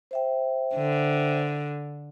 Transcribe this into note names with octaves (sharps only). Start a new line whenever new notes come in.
C5 E5 G5
D3